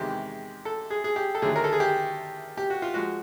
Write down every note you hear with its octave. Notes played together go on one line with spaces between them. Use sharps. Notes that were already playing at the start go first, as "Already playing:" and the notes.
Already playing: E2 C3 D#3 G#3 G4
A4
G#4
G#4
G4
A4
D#2 D3 F#3 A3 G#4
A#4
A4
G#4
G4
G4
F#4
F4
F3 G#3 F#4